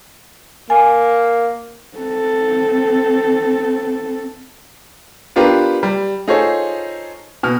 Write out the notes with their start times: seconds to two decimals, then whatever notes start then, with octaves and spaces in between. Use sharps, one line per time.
0.70 A#3 G#5
1.97 C4 A4
5.36 B3 D4 F4 G4 A#4 B4
5.83 G3
6.28 D#4 F4 G#4 A4 C5 C#5
7.43 B2 F6